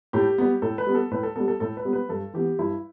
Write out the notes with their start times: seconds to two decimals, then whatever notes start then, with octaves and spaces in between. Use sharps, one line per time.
0.13 A2 G4
0.38 G3 B3
0.62 A2 A4
0.78 B4
0.87 G3 B3
0.95 A4
1.11 A2 B4
1.23 A4
1.36 G3 B3 A4
1.48 A4
1.60 A2 A4
1.77 B4
1.85 G3 B3
1.93 B4
2.09 G2 A4
2.33 E3 B3 G4
2.59 G2 E4